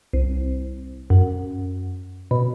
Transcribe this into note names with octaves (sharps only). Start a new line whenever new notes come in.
C2
F#2
B2